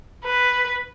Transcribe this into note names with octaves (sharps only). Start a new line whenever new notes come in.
B4